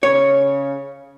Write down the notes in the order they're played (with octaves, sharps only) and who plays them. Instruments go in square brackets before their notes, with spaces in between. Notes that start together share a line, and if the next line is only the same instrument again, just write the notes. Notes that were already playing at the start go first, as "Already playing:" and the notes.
[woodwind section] C#3 [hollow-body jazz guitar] C#5